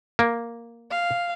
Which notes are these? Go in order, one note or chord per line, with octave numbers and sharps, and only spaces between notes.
A#3
F5